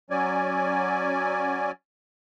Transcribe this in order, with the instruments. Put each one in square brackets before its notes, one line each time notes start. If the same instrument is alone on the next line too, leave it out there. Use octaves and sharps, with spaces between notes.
[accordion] F#3 C#4 D5 G#5